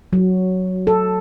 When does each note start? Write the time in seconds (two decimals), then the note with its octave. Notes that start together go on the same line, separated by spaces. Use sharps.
0.13 F#3
0.87 A4